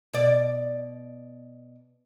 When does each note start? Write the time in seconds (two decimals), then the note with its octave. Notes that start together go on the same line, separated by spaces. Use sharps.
0.13 B2 D5